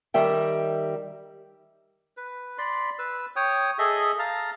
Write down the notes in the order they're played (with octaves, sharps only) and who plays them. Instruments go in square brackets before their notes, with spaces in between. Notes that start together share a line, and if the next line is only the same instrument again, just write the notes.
[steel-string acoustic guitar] D#3 G3 A#4 E5 G5
[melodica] B4
D5 B5 C6
B4 E6
C#5 G5 D#6
G#4 A4 D#5 E5
F5 A5 A#5